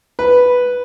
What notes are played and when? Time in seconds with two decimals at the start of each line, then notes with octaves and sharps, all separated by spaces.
0.19 B4